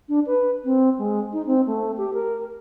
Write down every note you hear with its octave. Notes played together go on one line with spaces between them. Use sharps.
D4
B4
C4
G#3
D#4
C4
A3
G4
A#4